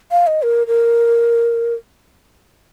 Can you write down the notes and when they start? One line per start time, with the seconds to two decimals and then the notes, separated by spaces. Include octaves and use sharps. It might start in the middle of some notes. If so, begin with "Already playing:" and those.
0.11 F5
0.27 D#5
0.43 A#4
0.67 A#4